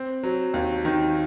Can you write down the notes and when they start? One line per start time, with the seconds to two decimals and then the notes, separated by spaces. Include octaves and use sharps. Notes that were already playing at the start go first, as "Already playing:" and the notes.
Already playing: C4
0.23 F#3
0.54 D#2
0.85 D#3